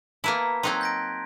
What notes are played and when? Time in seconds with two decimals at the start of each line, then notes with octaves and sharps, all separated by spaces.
0.24 A#3 B3 E4 A5 A#5 B6
0.63 F#3 C4 D#4 C6 F#6 G#6
0.81 G6 A#6 D7